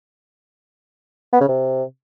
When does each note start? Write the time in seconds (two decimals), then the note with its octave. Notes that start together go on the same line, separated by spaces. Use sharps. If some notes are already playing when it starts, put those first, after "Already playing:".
1.33 B3
1.41 C#3
1.49 C3